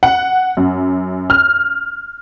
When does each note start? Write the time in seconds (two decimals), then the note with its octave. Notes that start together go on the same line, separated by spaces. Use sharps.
0.03 F#5
0.57 F#2
1.30 F6